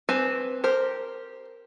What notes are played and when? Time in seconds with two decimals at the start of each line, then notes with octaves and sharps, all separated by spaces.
0.09 C4 G4 B4 G#5
0.64 G4 A#4 C5